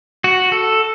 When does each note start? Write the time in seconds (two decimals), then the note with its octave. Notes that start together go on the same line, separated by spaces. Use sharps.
0.24 F#4
0.52 A4